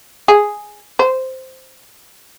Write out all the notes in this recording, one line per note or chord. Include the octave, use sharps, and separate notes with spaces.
G#4
C5